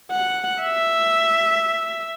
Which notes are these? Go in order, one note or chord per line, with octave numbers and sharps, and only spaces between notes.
F#5
E5